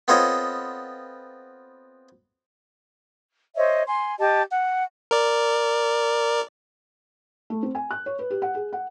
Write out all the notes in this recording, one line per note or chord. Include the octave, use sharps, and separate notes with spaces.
B3 C4 F4 A4 C#5 D#5
C5 C#5 D#5 E5
G#5 C6
G4 D#5 A5
F#5
A#4 D5
A3
C4
G#5
F#6
C#5
B4
G4
F#5
G#4
F#5